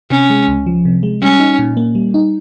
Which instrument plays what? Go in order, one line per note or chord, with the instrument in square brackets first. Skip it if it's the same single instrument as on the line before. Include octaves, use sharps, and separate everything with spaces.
[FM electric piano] C3 [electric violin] C#4
[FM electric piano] G#3
C#2
F3
C3
G#3
[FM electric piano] G3 [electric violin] C#4
[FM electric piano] D#4
A#2
A#3
G3
D#4